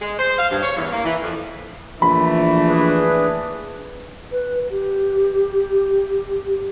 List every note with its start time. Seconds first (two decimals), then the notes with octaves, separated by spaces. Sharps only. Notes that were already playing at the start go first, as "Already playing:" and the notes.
0.02 G#3
0.19 C5
0.38 F5
0.51 G2
0.63 C#5
0.77 E2
0.92 A#3
1.05 E3
1.22 F2
2.02 A#1 E3 A3 B5
2.68 D4 G#4 B4
4.32 B4
4.71 G4